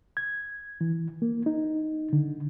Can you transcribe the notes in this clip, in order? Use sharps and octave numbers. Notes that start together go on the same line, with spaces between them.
G#6
E3
A#3
D#4
D3